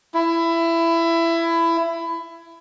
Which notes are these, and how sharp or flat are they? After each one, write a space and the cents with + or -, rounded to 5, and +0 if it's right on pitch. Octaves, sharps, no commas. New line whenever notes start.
E4 +20